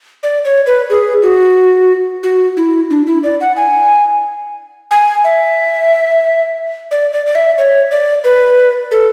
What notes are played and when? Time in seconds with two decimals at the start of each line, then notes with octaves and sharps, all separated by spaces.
0.23 D5
0.45 C#5
0.67 B4
0.90 G#4
1.23 F#4
2.23 F#4
2.57 E4
2.90 D4
3.07 E4
3.24 D5
3.41 F#5
3.56 G#5
4.91 G#5
5.24 E5
6.91 D5
7.13 D5
7.26 D5
7.35 E5
7.58 C#5
7.91 D5
8.24 B4
8.91 A4